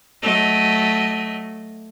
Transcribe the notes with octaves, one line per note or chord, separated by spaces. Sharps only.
F#3 A3 D#5